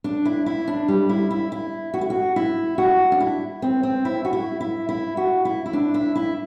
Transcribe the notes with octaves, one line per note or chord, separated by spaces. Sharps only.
D4
E4
E4
D4
G3
E4
E4
E4
F#4
E4
F#4
E4
F#4
D4
E4
C4
C4
E4
F#4
E4
E4
E4
F#4
E4
E4
D4
E4
E4